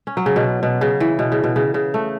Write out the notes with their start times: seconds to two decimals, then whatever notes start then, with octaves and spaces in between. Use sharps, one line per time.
0.07 C#4
0.17 F#3
0.26 C#3
0.36 B2
0.63 B2
0.81 C#3
1.00 E3
1.19 B2
1.32 C#3
1.44 B2
1.56 C#3
1.74 C#3
1.94 A3